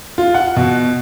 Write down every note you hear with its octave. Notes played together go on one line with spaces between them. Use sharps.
F4
F#5
B2